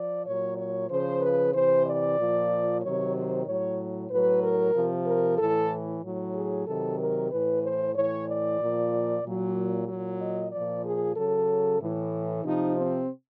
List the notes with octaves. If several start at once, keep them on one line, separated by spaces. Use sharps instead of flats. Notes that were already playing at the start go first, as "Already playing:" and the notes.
Already playing: F3 D5
A#2 F#3 C#5
C#5
C#3 F3 C5
B4
C3 E3 C5
D5
A#2 F3
C3 D#3 F#3 C#5
C5
A2 F#3 C#5
A2 F#3 B4
A#4
C3 F3
A#4
A2 E3 A4
A2 F#3
G#4
C3 D#3 F#3 A4
A#4
A2 E3 B4
C5
A2 E3 C#5
D5
A#2 F3
A#2 F#3
A#2 F#3
D#5
A#2 F3 D5
G#4
C#3 F#3 A4
A2 E3
C3 F3 D#4
C4